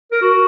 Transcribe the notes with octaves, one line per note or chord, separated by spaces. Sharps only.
A#4
F#4